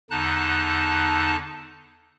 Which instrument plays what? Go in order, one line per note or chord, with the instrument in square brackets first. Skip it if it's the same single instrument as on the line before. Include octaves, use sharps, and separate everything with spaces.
[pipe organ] E2 D3 D#4 A5 F#6